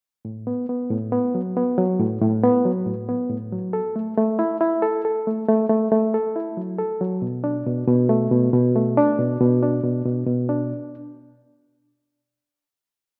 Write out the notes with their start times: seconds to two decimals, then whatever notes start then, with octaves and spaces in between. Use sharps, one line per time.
0.25 A2
0.47 B3
0.69 B3
0.90 A2
1.12 B3
1.35 F#3
1.57 B3
1.78 F#3
1.99 A2
2.21 A2
2.43 B3
2.65 F#3
2.86 A2
3.09 B3
3.30 A2
3.52 F#3
3.73 A4
3.96 A3
4.17 A3
4.39 E4
4.61 E4
4.82 A4
5.05 A4
5.27 A3
5.48 A3
5.69 A3
5.92 A3
6.14 A4
6.36 E4
6.57 F#3
6.78 A4
7.01 F#3
7.22 B2
7.44 D4
7.67 B2
7.87 B2
8.09 A3
8.31 B2
8.53 B2
8.76 A3
8.97 D4
9.19 B2
9.40 B2
9.63 D4
9.83 B2
10.05 B2
10.27 B2
10.49 D4